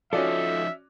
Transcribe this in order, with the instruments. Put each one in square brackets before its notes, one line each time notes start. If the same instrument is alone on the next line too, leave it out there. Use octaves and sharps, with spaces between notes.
[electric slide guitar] F3 D#4 [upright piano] C#4 F#4 D5 [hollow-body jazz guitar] F4 A4 [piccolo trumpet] E5